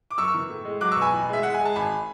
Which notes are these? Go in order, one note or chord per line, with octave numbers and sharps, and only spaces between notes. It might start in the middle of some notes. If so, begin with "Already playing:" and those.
D6
F#2 C#6 E6
E3
A2
G#3
F#3 D6 F#6
C#6 E6
B2
G#5 B5
A1
G#3 E5
G#3 F#5
G#5
G#3
A5
G#1 G#5 B5